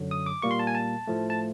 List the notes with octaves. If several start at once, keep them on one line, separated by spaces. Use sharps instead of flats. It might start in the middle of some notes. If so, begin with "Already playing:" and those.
Already playing: F#2 D3 F#3
D#6
D6
A#2 G3 A#3 C#6
C6
A5
G#5
A5
A2 F3 A3
A5